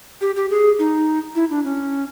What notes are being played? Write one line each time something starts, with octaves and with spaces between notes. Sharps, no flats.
G4
G4
G#4
D#4
E4
D4
C#4